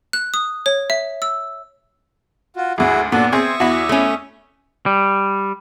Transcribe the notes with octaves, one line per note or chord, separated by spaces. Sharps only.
F#6
D#6
C#5
E5
E6
F4 F#4
G#1 D2 E4 F#4 G#4
D#2 A#2 B3 D4 F#4 A4
C4 G#4 E5 C6 C#6 D#6 G#6
E2 E4 F#4
A3 C#4
G3